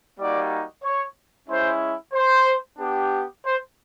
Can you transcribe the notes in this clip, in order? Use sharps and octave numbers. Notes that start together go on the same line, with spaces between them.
G3 A#3 D#4 F#4 D5
C#5
G#3 C#4 E4 C5
C5
B3 D4 G4
C5